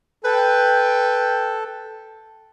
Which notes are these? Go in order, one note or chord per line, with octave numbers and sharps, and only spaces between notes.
A4 B4 G5